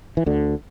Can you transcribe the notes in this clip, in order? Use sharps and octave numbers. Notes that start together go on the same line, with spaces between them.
E3
D2 D3